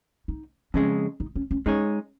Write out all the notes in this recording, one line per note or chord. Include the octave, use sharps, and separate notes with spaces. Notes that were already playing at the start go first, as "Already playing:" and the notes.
D#4
F2 C#3 G#3 C#4
D#4
C#4
C#4
G#3 C#4 D#4 G#4 C#5